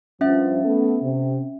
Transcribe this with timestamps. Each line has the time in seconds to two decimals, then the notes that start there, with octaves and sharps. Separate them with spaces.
0.21 G2 F3 C#4 E5
0.64 A3 B3 A4
1.02 C3